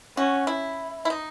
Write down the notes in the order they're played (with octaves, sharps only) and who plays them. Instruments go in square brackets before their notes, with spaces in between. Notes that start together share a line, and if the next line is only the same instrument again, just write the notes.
[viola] C#4 [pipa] F#4
[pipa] E4
E4
D#4